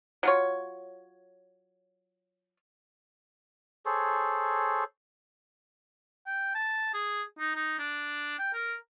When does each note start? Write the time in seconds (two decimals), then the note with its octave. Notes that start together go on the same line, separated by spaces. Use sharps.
0.23 F#3 F4 C#5
3.86 G#4 A4 C5 C#5
6.26 G5
6.55 A5
6.93 G#4
7.39 D#4
7.55 D#4
7.79 D4
8.39 G5
8.53 A#4